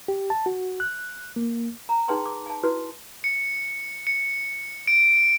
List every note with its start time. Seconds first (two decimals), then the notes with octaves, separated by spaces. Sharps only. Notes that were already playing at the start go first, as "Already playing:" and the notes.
0.08 G4
0.30 A5
0.46 F#4
0.80 F#6
1.36 A#3
1.89 A#5
2.08 D#4 G#4 B4 G5 A5 C6
2.26 D6
2.46 G#5 A5
2.63 E4 F#4 B4
3.24 C#7
4.07 C#7
4.87 D7